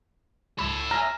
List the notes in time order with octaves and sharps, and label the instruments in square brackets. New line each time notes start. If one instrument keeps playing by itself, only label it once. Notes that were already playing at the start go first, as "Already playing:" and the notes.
[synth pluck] C#2 B5 [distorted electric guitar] C#5 E5
[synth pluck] G#5 F6 [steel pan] A#5